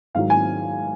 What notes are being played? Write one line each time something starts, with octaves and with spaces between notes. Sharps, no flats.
G#2 D#3 F#3 F5
G#5